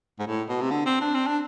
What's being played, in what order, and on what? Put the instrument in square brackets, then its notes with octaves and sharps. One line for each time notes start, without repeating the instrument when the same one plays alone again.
[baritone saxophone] G#2
A2
B2
C3
D3
C4
D4
C4
D4